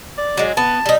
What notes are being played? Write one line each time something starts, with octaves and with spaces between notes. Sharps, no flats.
D5
F#3 G#3
B3 A5
G3 D#4